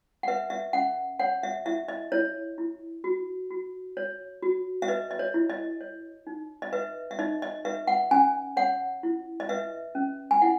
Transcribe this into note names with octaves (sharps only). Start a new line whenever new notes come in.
F#5
B4 E5
E5
C#4 F#5
C#5 F#5
E5
E4 E5
D#5
E4 C#5
E4
F#4
F#4
C#5
F#4
E5
B4 D#5
D#5
C#5
E4
D#5
C#5
D#4
D#5
B4 E5
E5
D#4 D#5
D#5
B4 E5
F#5
C#4 G#5
C#5 F#5
E4
D#5
B4 E5
C#4
G#5
E4 F#5